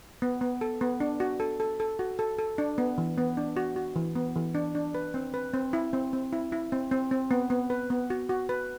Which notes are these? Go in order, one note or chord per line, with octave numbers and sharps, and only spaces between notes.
B3
B3
A4
B3
D4
F#4
A4
A4
A4
F#4
A4
A4
D4
B3
E3
B3
D4
F#4
F#4
E3
B3
E3
D4
D4
B4
C4
B4
C4
E4
C4
C4
E4
E4
C4
C4
C4
B3
B3
B4
B3
F#4
F#4
B4